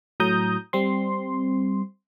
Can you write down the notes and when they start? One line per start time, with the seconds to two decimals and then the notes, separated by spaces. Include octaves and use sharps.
0.20 A2 F#3 A#5 D#6 G6
0.73 G3 C4 C6